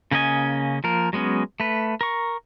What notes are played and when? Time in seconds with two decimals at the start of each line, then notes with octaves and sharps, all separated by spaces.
0.11 C#3 A#3 C#4 D#5 G#5
0.84 F3 A#3 A#4
1.13 F#3 G#3 B3 C#4
1.60 A3 B4
2.01 A#4 C#6